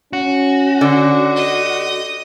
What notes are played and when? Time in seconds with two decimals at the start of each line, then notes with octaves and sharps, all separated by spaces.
0.13 C#4 F#4
0.81 D3
1.36 D#5